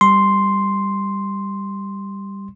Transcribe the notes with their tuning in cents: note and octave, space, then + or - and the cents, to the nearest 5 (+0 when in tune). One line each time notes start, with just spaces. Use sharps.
G3 +10 C6 +0